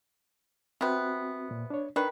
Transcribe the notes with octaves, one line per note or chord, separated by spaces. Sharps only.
C3 B3 C4 F#4
A#2
D4 C#5
D#3 D4 B4